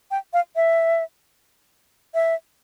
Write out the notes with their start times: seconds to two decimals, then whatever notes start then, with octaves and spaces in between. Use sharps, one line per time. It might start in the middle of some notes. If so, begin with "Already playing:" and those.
0.11 G5
0.33 F5
0.56 E5
2.14 E5